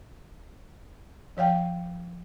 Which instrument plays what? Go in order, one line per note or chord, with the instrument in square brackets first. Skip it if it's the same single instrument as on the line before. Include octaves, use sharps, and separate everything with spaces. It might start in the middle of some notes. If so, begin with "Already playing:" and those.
[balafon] F3 C#5 F5 G5